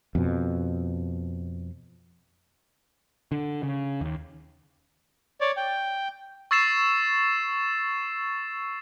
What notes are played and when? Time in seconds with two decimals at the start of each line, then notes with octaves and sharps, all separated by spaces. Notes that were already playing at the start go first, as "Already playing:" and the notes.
0.15 F2 B2
3.32 D3
3.63 C#3
4.01 D#2
5.41 C#5 D5
5.57 G5
6.51 C#6 E6 A6 C7 E7